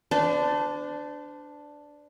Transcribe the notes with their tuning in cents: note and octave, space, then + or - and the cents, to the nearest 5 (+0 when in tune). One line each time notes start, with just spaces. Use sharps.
D4 +0 C5 -40